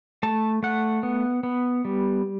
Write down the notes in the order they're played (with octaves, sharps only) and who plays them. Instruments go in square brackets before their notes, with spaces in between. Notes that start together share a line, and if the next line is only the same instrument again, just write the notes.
[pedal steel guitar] A3 A5
A3 F#5
B3
B3
G3